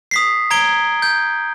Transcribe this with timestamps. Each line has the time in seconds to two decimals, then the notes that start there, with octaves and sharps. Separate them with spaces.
0.11 D#6 B6 C7
0.51 A#5 G#6 D7 G7
1.02 G6